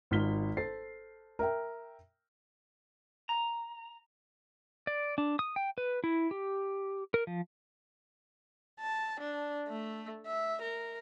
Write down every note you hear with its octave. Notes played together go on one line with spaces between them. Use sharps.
G#1 D#4 F4 F6 B6 G7
A4 C5 A6 C7
A#4 E5 G5
A#5
D5
D4
D#6
G5
B4
E4
G4
A#4
F3
A5
D4
A3
E5
A#4